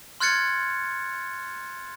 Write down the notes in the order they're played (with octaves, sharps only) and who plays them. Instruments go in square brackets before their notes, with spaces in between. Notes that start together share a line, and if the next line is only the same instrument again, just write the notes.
[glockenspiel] C6 F6 F#6 G#6 A6 C#7